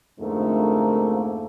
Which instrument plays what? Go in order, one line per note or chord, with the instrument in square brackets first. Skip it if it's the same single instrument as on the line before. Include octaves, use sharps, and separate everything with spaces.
[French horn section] F2 G#2 D3 A3 A#3